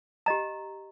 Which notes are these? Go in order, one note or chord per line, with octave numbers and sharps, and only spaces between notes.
G4 D#5 A#5